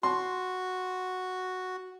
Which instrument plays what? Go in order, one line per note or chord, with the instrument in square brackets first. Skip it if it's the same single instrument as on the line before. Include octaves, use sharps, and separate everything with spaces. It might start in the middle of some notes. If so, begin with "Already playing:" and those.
[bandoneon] F#4 [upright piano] C6